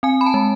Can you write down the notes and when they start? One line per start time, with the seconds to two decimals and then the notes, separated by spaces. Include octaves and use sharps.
0.03 C4 G#5
0.21 B5
0.26 A5
0.34 G#3